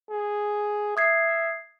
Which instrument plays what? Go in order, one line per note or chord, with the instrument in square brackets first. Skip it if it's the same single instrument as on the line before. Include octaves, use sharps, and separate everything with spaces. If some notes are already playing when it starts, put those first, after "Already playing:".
[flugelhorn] G#4
[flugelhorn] E5 [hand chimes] D#6 G#6 C7